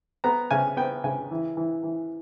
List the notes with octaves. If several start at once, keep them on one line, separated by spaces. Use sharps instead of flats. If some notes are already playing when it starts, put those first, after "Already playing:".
B3 A#5
C#3 G#5
B3 G5
C#3 G#5
E3
E3
E3